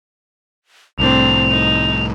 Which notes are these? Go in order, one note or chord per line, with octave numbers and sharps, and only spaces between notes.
C2 A2 C4 D4 F7
D#4